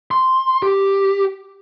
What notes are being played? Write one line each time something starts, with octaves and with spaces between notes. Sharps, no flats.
C6
G4